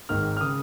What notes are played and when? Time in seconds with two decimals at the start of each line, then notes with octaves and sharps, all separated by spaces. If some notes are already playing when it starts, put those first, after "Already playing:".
0.09 G#1 G#2 D#3 F6
0.37 F6
0.41 C#3 D#6